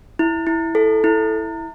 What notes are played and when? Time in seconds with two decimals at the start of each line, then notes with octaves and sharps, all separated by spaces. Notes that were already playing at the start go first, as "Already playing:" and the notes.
0.19 E4
0.47 E4
0.75 A4
1.04 E4